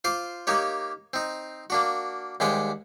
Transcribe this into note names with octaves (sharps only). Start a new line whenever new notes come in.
F4 C5 C6 D6
A#3 D#4 G4 C#5
C4 D#4
A#3 D4 F#4
D#2 G3 G#3 C5 F#5 G5